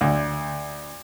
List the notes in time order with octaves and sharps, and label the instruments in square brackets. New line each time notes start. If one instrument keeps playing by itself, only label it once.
[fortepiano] D2